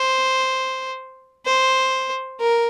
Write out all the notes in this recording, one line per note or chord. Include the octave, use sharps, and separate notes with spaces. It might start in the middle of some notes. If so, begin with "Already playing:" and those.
Already playing: C5
C5
A#4